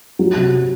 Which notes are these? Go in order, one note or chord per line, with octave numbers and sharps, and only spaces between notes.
F#3
C3